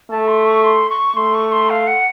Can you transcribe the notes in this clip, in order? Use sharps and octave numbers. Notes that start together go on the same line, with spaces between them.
A3 A5
C6
C#6
C6
C#6
A3 C6
C#6
C6
F5
F#5